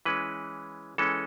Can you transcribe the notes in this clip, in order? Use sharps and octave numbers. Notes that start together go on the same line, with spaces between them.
E3 G#3 C#4 B4
E3 G#3 C#4 A4